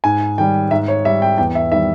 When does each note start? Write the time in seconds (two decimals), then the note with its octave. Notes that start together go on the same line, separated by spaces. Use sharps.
0.04 G#2 G#5
0.38 D#3 G3 G5
0.71 G#2 E5
0.88 C#5
1.05 G3 E5
1.22 G5
1.38 E2 G5
1.55 E5
1.72 D#3 G3 E5